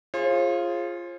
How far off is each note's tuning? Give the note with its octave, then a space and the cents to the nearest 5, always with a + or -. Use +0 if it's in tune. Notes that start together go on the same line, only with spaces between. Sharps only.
F4 -10 G#4 +0 C5 +45